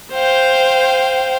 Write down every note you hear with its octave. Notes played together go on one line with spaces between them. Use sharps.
C5 F5 G5